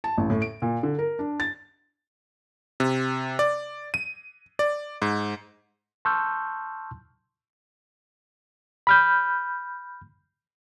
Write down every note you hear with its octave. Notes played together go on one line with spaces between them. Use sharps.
A5
A1
A2
D7
A#2
D3
A#4
D4
A6
C3
D5
D#7
D5
G#2
A5 C6 C#6 E6 F6 G6
B5 F6 G6